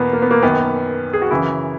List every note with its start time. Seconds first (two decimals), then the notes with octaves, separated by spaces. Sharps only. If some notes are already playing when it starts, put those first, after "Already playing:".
Already playing: E2 B2 A#3 B3
0.13 A#3
0.22 B3
0.31 A#3
0.43 F#2 D#3 B3
1.13 G#4
1.22 F#4
1.31 F#2 C#3 E3 E4